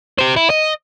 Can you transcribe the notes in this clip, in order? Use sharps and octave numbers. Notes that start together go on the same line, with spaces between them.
G4 C5
E4
D#5